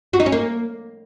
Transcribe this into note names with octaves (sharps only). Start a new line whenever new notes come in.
F#4
D#4
C#4
A#3